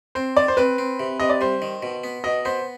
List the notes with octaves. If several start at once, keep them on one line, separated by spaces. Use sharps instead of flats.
C4 C5
D#3 D5
C5
C4 B4
C4
C3
C3 D#5
D5
G3 C5
D#3
B2
B3
B2 D#5
B3 C5